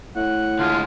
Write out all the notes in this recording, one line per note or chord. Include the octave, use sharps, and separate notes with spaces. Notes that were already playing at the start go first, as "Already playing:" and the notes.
A2 F#5
D3 G#3 F4